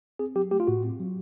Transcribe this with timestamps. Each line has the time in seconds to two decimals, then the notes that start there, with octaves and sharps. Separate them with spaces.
0.19 C4 G#4
0.36 F#3 G4
0.51 A3 G4
0.60 F4
0.67 A2 F#4
0.84 C4
1.00 F#3